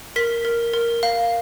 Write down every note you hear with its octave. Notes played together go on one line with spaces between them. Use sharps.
A#4 B6
A#4
A#4
F5